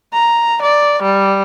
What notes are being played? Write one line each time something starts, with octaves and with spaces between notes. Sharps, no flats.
A#5
D5
G3